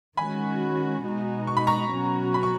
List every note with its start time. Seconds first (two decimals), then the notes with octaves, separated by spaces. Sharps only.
0.17 D#3 G#3 C#4 F#4 G#5 B5
1.03 B2 G#3 D#4 F#4
1.47 C#6
1.57 B5
1.67 A#5 C#6
1.90 B2 F#3 C#4 F#4
2.34 B5
2.43 C#6